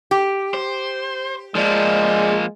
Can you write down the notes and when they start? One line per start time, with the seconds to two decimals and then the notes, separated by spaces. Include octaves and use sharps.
0.11 G4
0.54 C5
1.55 F3 G#3 A#3 G#4 D5